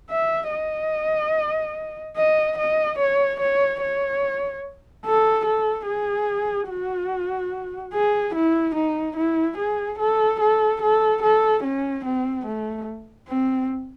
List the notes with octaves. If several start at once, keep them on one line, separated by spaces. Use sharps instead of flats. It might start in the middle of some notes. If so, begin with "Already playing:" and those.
E5
D#5
D#5
D#5
C#5
C#5
C#5
A4
A4
G#4
F#4
G#4
E4
D#4
E4
G#4
A4
A4
A4
A4
C#4
C4
A3
C4